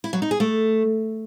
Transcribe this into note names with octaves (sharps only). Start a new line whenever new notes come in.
E4
F#3
D#4
G#4
A3